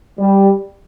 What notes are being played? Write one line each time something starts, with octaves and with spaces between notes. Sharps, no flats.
G3